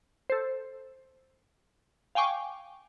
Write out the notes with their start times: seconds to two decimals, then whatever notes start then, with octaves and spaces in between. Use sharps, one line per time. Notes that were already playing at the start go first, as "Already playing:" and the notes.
0.30 A4 C5
2.15 F5 G5 G#5 C#6 D6